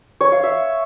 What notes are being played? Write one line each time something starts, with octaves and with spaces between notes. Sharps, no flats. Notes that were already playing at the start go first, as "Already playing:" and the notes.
C#5
F5
E5